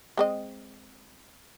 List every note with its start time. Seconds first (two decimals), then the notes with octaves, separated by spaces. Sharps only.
0.17 G#3 C4 D#5